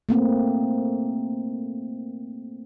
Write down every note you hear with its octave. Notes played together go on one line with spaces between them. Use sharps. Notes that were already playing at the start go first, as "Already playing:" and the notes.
A3 A#3 C4